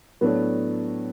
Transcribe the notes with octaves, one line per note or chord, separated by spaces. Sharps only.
A2 F#3 A3 B3 D4